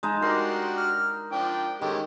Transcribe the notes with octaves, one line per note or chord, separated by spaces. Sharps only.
G#3 D#4 A5
D4 F#4 G4 A#4 C6
F6
F3 D4 G5
D#3 G#3 C#4 G4 A4